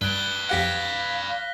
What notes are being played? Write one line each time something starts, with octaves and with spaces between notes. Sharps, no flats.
G2 B4 D5 F#6 G7
F2 G4 F5 F#5 F#6 A#6 B6